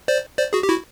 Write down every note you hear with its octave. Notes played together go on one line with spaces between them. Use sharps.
C5 D5
C5 D5
F#4 G#4
G4
E4 F#4